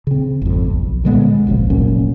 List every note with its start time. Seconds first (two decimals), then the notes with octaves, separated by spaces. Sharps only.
0.07 C#3 C4
0.42 G#1 F2
0.67 B1
1.03 A#2 D3 G#3 B3
1.47 D#1 G#1 C#2 F3
1.70 F1 A#2 F#3 C#4